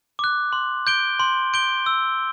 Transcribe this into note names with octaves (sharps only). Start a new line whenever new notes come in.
D6 F#6
C6
G6 D7 G7
C6
G6 D7 G7
E6